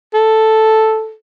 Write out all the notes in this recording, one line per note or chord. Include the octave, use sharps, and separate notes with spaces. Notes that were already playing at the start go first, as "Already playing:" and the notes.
A4